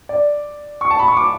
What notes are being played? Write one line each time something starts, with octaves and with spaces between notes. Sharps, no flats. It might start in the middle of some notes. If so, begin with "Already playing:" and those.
D5
C#6
A5
B5
C#6
D6